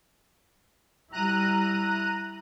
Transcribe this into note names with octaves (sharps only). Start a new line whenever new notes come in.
G3 E4 A#5 F#6 D#7